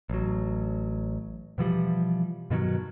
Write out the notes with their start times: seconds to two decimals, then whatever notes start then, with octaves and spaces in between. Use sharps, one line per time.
0.10 A1 F#3
1.58 B2 E3 F3 G3
2.50 G2 B2 D#3 F#3